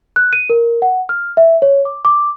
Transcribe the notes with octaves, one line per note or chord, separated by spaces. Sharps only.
F#6
D#7
A#4
F#5
F6
E5
C#5
D6
D6